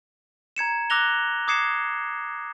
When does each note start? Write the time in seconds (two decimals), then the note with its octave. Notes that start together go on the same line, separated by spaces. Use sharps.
0.57 A#5 G#6 C#7 E7
0.90 D6 E6 F#6 A#6 F7 G7
1.48 D6 D#6 G#6 C7 C#7 E7